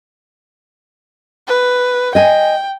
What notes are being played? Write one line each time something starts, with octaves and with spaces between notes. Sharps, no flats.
B4
D#5 G5 G#5